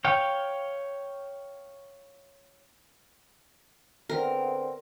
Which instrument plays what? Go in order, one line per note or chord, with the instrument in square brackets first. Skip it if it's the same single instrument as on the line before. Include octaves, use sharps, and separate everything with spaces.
[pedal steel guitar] C#5 F5 G5
[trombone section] D3 B3 C4 [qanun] A#4